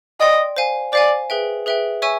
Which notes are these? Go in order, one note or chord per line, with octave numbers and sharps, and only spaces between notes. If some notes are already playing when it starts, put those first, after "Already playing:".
D5 D#5 G5 C6
C5 F5 G#5
C5 D5 F5 G#5
G#4 B4 E5 G5
G#4 B4 E5 G5
C#5 E5 G#5 C#6 E6